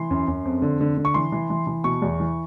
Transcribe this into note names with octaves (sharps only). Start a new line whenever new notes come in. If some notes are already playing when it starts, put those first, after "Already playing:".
Already playing: E3 C6
F#2
F#2
F2
D3
D3
D3
C#6
E3 C6
E3
E3
E3
B2 C#6
E2
E3